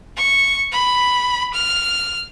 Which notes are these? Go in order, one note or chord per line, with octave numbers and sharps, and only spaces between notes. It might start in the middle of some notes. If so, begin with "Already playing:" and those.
C#6
B5
F6